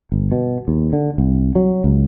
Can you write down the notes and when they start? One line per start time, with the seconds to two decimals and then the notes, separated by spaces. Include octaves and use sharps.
0.12 G1
0.32 B2
0.68 D#2
0.93 D3
1.18 C2
1.55 F#3
1.84 C#2